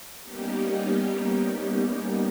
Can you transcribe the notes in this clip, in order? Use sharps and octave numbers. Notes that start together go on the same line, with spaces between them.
G3 A#3 B3 C#4 D#4 G4